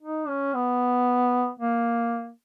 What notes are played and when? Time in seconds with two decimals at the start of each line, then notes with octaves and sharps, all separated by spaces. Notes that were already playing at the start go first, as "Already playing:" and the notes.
0.02 D#4
0.28 C#4
0.54 B3
1.60 A#3